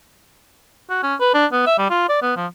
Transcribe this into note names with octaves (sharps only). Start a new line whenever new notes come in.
F#4
C#4
B4
D4
B3
E5
G3
F4
D5
B3
F3